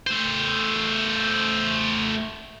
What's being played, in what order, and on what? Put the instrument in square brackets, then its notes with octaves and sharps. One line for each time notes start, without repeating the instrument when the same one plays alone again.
[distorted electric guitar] A3 C5